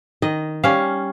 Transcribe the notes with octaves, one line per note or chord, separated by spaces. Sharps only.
D#3 D#5
G3 C#4 F5